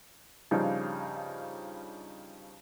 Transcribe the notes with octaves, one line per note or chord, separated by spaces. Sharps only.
G2 C#3 F3 G3 D#4